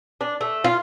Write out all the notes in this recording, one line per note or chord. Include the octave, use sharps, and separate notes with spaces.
D4
A3
F4